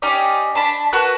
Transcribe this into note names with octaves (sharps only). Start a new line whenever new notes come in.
C#4 D#4 G4 D5
D4 A5 B5
F#4 A#4 B4 F#6